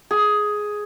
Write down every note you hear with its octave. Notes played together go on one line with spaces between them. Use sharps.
G#4